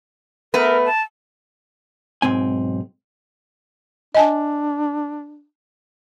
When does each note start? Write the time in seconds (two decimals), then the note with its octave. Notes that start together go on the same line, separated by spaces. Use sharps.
0.54 A3 B3 A#4 B4
0.86 A5
2.22 B1 G#2 C4 G#5
4.15 D4 D#5 G#5 A5